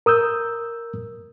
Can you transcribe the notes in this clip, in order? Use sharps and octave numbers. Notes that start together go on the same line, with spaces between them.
A#4 D#6 E6 G6